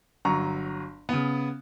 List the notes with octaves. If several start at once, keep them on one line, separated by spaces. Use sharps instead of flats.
G1 F#3 A#5 C#6
C#3 B3